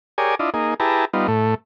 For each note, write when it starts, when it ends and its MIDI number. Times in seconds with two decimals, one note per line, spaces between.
0.18 0.35 67
0.18 0.35 68
0.18 0.35 70
0.18 0.35 73
0.18 0.35 74
0.18 0.35 80
0.39 0.50 62
0.39 0.50 64
0.39 0.50 65
0.39 0.50 75
0.54 0.74 58
0.54 0.74 63
0.54 0.74 68
0.80 1.05 64
0.80 1.05 67
0.80 1.05 68
0.80 1.05 71
0.80 1.05 81
0.80 1.05 82
1.13 1.27 55
1.13 1.27 59
1.13 1.27 63
1.13 1.27 65
1.28 1.55 45
1.28 1.55 57